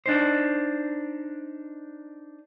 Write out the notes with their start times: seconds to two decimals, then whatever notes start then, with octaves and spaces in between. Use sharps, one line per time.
0.06 D4 D#4 C5